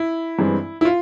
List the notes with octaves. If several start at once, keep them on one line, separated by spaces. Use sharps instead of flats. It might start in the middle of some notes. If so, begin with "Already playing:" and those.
Already playing: E4
G2 E3 G#3 C4
E4
F4